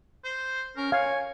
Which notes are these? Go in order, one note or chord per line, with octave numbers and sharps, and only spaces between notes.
C5
C#4 A#4
C#5 F5 G#5